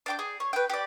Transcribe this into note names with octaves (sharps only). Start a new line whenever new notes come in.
D4 G5 D6
G#4
C#5
B4 G5
G4 D5